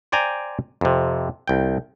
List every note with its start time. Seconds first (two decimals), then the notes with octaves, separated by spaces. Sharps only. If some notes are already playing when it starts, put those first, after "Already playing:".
0.12 C5 D5 G5 G#5 A#5
0.81 F2 C3
1.48 C2 G5